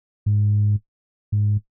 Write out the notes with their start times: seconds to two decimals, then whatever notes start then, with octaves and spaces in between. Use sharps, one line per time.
0.26 G#2
1.32 G#2